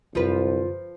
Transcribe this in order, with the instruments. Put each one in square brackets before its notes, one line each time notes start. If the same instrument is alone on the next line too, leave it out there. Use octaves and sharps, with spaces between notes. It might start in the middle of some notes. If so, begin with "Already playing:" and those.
[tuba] C2 [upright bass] F#2 D3 [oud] F3 B4 [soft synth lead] F4